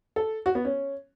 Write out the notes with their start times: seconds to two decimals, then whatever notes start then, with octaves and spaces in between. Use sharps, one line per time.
0.16 A4
0.46 F#4
0.55 B3
0.65 C#4